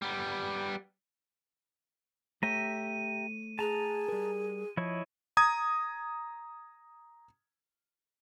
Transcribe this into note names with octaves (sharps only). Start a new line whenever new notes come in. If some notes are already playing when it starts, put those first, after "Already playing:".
G3 B3
A3 G4 C#5 E5 A#5 D#7
G#4 A5 A#5
G3 A#4
F3 E4 C#5 D#5
A#5 D#6 G#6